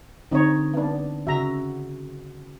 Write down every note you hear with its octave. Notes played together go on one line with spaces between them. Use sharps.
D3 C4 D#4 C#5 D#5
B3 D4
C#3 F#4 E5 A#5